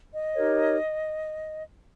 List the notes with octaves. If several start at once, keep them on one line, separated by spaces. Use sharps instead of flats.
D#5
D#4 G4 A#4 C#5